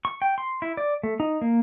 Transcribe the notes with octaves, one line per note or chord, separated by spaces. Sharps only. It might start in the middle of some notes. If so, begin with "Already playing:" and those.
C#6
G5
C6
E4
D5
A3
D#4
A#3